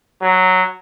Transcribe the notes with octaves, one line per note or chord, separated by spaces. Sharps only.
F#3